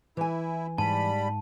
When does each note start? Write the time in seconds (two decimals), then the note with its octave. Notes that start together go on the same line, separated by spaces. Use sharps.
0.17 E3 E4 G#5
0.78 G#2 G3 A5 B5